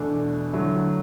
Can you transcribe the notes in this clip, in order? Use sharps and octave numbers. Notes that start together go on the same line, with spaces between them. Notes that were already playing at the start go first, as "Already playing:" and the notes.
Already playing: E2 B2 A3 D4 A4
D3 F#3 A3 E4